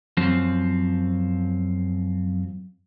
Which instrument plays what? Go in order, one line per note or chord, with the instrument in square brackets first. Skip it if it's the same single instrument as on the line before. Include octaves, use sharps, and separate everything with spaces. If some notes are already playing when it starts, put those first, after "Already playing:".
[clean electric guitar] F#2 F3 C4